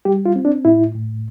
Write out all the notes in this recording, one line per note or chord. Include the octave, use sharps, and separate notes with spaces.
G3 G4
F4
C4
D4
A2 E4
A2